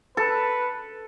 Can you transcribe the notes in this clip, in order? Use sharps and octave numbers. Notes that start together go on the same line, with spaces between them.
A4 B4